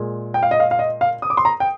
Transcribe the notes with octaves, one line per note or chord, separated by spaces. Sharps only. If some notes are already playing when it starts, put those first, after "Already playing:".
Already playing: A#2 G#3
G5
F5
D#5
F5
F5
D#5
F5
D#6
D6
C6
A#5
G5